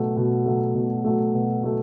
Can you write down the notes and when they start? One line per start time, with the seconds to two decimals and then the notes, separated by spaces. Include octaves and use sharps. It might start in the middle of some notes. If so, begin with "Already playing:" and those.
Already playing: B2 F#3 A3
0.17 B2
0.46 F#3 A3
0.75 B2
1.05 F#3 A3
1.34 B2
1.63 F#3 A3